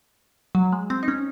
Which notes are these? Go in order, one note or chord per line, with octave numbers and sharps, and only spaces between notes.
F#3
G#3
C4
D#4
C#4